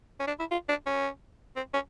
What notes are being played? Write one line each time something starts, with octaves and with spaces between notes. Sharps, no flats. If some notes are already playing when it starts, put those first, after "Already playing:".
C#4
D4
E4
F4
D4
C#4
C4
C#4